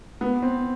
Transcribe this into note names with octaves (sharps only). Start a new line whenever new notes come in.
B3
C4